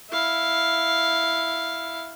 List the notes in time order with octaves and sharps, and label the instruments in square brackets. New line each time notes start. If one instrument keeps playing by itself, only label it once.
[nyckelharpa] E4 F5